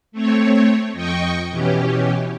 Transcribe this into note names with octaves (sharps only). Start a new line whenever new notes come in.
A3 C4 C#5
F2 D#5 G5 C#6
B2 E3 C#4 G4